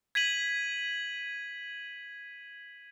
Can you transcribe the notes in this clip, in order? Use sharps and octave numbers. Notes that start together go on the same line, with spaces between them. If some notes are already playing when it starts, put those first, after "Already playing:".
G#6 B6 D#7 F#7